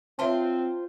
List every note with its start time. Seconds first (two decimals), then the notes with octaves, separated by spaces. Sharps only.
0.19 C4 F4 C5 C#5 E5 G5 A5 C6